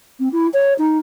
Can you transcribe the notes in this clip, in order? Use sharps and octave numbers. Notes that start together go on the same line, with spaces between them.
C4
E4
C#5
D#4